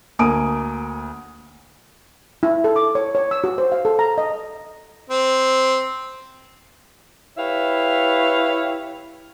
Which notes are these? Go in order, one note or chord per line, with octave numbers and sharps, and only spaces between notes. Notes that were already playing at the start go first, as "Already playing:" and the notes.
D2 A#3 G#5 D#6 D7
E4
A4
D6
C#5
C#5
E6
F#4
C5
F5
A4
A#5
D#5
C4
E4 G4 B4 C#5 E5 F5